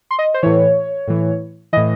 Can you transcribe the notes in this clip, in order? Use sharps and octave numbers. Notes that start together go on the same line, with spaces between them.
C6
D#5
C5
A2 E3 C#5
A2 E3
A2 E3 D#5